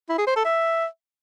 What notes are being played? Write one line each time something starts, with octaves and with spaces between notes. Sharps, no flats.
E4
G#4
C5
A4
E5